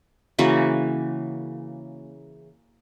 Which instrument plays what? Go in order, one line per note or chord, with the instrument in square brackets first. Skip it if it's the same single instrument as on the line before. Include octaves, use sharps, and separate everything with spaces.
[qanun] C#3 E3 A#3 F#4